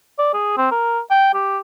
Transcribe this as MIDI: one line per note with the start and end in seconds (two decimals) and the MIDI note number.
0.19 0.32 74
0.34 0.54 68
0.57 0.67 60
0.71 1.00 70
1.10 1.32 79
1.34 1.59 67